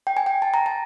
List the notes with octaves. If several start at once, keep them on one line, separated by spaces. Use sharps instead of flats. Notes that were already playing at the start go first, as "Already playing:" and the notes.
G5
G#5
G5
A5
A#5
A5